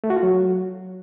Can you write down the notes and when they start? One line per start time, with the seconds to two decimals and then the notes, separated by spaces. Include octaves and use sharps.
0.04 A3
0.10 F#4
0.16 F4
0.23 F#3